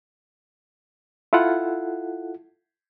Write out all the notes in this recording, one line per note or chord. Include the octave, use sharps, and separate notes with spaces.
E4 F4 A4 F#5